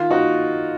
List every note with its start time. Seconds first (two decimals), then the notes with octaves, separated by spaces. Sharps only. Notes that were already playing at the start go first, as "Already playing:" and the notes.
Already playing: D#3 F4
0.11 D#4 F#4